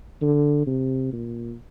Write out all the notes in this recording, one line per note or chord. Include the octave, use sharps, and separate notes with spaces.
D3
C3
A#2